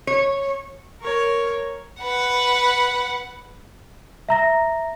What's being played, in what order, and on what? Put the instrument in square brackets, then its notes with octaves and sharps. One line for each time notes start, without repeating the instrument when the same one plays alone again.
[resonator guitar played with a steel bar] C#5
[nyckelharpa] A#4 C#5
[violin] B4 F#5
[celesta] E5 A#5 A#6